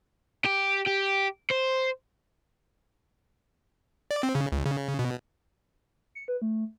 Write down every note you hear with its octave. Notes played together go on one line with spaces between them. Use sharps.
G4
G4
C5
D5
C4
C#3
C#2
C#3
B2
C#7
B4
A3